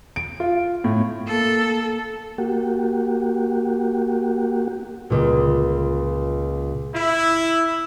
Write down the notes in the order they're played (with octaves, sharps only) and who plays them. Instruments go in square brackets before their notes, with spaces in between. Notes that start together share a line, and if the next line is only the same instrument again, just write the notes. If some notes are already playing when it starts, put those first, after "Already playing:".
[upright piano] D7
F4
A2
[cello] A#3 A4
[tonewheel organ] A#3 F#4 G4
[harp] C#2 A#2
[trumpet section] E4